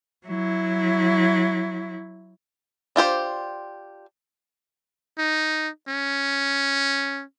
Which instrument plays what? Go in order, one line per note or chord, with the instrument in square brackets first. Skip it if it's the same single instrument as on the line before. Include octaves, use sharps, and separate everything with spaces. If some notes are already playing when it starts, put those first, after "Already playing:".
[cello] F#3 E4
[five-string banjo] D4 F4 G4 C5
[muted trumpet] D#4
C#4